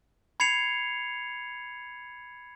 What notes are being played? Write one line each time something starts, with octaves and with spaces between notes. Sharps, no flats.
B5 G#6 C7 C#7 F7